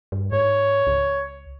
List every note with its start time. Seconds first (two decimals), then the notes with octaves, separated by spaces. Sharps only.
0.12 G2
0.32 G#2 C#5
0.87 C#2